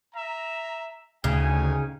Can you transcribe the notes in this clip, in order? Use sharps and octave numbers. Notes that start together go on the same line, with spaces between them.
E5 A#5
D2 C#3 D#4 G5 G#5